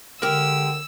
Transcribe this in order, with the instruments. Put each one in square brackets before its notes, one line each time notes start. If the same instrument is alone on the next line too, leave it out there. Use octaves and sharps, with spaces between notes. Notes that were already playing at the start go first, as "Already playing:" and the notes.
[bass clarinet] D3 [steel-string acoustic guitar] G#3 G4 [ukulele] A#4 [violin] E6